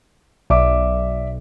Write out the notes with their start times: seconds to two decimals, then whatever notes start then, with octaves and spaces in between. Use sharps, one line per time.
0.50 B1 D5 E5 D6